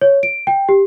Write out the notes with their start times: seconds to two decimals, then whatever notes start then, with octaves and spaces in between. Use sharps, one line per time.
0.02 C#5
0.23 D7
0.47 G5
0.69 G4